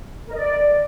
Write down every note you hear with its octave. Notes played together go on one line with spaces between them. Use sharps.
A#4
D#5
D5